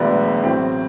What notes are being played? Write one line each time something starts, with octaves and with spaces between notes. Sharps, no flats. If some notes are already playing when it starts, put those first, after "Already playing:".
Already playing: E1 D2 D3 F#3 B3
A1 A2 F#3 C4 E4